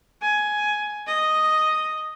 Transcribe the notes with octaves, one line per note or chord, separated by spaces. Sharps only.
G#5
D#5